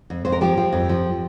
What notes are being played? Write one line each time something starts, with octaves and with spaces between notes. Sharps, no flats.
F2
F2 C5
A#4
F3 G4
F3
F2
F3